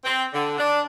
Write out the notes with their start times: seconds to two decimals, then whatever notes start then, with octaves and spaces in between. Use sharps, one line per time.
0.04 C4
0.33 D3
0.58 D4